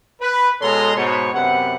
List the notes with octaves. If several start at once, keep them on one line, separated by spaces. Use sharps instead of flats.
B4
B2 G#3 A4 C#5 A#5 C6
G#2 B2 C#5
F#2 C3 B3 F#5